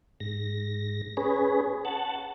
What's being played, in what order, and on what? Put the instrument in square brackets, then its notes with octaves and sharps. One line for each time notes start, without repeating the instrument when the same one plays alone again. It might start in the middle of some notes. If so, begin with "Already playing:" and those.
[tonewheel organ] G#2 A#6
C#4 G#4 B4
F#5 A5